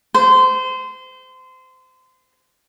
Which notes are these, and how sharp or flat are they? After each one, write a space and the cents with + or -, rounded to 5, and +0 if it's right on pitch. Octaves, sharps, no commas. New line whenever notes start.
C5 -25